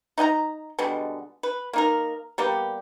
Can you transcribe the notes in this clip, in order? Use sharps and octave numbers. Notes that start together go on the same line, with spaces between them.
D#4 D#5 F#5 A#5
B2 D3 G3 G#3
B4
A#3 D#4 A#4
G3 A#3 B3 G4